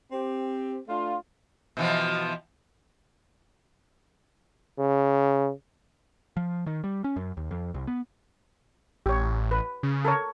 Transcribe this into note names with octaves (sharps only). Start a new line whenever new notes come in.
C4 G4
A3 D4 F4
B2 E3 F3
C#3
F3
D#3
G3
C#4
F#2
D#2
F2
C2
B3
A1 G4 C#5
B4
C#3
A4 A#4 C#5